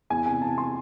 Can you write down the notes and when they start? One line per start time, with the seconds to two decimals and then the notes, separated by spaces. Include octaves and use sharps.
0.10 E2 G#5
0.26 C3 G#5
0.42 E2 A5
0.58 C6